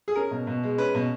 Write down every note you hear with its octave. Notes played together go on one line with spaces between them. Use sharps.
G#4
C#4 A#4
B2
B2
G#3
C#4 B4
B2